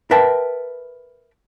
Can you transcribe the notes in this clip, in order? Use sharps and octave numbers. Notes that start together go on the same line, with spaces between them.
A#4 B4 E5 G5 A5